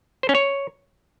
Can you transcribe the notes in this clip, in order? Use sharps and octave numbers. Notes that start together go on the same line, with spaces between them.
C5
C#4
C#5